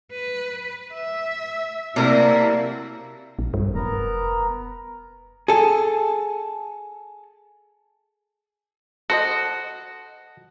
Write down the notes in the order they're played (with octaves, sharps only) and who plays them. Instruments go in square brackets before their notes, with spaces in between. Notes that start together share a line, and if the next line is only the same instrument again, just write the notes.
[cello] B4
E5
[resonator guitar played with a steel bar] C3 A#4 [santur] F#3 A4 D5 [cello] A#3 E4
[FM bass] A#1
G2
[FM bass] F1 [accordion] B3 A#4 A#5
[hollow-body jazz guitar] G#4 A4
[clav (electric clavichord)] F#4 [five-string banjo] A4 C5 D#5